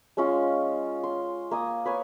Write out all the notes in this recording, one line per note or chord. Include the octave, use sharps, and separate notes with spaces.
G#3 C#4 F4
C6
A#3 G#5 D#6
B4 C#5 G#5